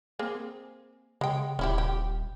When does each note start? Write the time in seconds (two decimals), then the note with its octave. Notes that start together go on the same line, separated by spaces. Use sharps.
0.19 A#3 C4 G#4
1.21 C#3 G#3 G5
1.59 D#1 C#4 E4 G4
1.78 G4